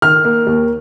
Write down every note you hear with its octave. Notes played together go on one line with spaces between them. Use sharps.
D#3 F6
A#3
D#2